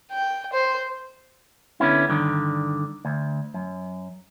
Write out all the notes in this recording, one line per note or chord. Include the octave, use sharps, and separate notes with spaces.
G5
C5
D3 B3 C#4 E4
G2 D3 D#3
D2
F#2